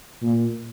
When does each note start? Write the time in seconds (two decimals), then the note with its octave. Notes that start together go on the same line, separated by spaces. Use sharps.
0.22 A#2